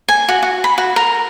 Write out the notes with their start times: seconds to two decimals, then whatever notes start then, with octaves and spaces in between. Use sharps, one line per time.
0.08 G#5
0.29 F#4
0.43 F#4
0.64 B5
0.78 F#4
0.96 A#4